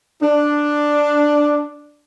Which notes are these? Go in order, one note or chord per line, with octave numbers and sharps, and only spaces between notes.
D4